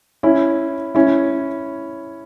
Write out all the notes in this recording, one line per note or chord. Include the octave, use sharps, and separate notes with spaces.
C#4 E4
C#4 E4